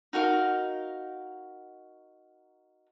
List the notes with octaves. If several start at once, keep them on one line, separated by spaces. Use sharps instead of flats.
D#4 F#4 A#4 F5